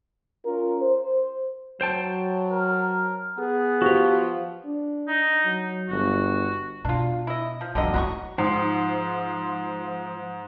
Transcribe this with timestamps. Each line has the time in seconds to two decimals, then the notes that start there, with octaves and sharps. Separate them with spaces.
0.46 C#4 F4 A#4
0.80 C5
1.81 F#3 C5 G5 A5
2.52 A#4
3.38 B3 G#4
3.82 F3 F#4 G4
4.65 D4
5.08 D#4
5.45 F#3
5.89 G1 F#4
6.85 B2 D4 F4
7.27 E4 D#5
7.61 F3
7.75 E2 D3 D#3 F#3 D#5
7.94 F#3 E4 F#4 A#5 C#6
8.38 G#2 F3